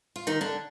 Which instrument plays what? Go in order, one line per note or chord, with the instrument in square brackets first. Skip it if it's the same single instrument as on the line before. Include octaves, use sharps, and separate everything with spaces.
[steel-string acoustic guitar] F4
D#3 D#4
D3 D4